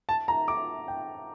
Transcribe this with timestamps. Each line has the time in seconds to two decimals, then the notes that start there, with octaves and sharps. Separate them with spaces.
0.09 A5
0.28 A#5
0.48 D6
0.88 G5